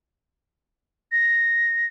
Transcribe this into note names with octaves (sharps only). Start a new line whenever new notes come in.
A#6